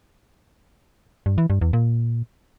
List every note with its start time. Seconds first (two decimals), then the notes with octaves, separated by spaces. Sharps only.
1.26 G2
1.38 E3
1.50 G2
1.61 E2
1.73 A#2